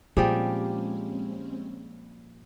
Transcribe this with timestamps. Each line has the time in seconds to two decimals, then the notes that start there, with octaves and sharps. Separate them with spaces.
0.17 A#2 F3 G3 G#3 C4 C#4 G4 G#4